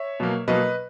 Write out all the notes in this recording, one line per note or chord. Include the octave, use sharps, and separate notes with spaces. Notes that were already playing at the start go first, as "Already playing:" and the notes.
Already playing: C#5 E5
B2 F#3 A#3
B2 F#3 A#3 B4 D#5